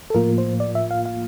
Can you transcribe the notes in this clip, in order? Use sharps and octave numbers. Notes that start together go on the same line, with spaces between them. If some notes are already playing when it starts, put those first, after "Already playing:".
A4
A2 F3 A#3 F4 A#4
C5
D5
E5
F5
F5